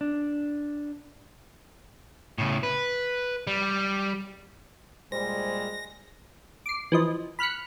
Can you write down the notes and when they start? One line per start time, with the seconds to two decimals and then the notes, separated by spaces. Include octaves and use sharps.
0.01 D4
2.38 A2 C#3
2.63 B4
3.47 G3
5.12 A#2 G3 G#3 C5 A#6
6.66 D6 C7
6.92 E3 F3 D#5
7.39 B5 F6 F#6 B6 C#7